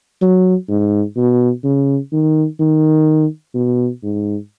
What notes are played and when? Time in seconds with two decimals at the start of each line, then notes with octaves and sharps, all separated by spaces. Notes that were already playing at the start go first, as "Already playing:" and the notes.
0.22 F#3
0.69 G#2
1.17 B2
1.64 C#3
2.12 D#3
2.60 D#3
3.55 B2
4.03 G#2